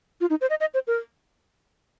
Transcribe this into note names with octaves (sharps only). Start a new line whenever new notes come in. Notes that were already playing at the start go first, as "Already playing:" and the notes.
F4
D#4
C5
D#5
D#5
C5
A#4